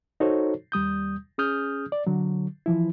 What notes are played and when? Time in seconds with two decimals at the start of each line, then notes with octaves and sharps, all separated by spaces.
0.20 D#4 F#4 A4 C5 C#5
0.72 D#2 G3 D#6 G6
1.38 C#4 G#4 D#6 F6 G6
1.92 D5
2.07 D3 F#3
2.66 E3 F3 E4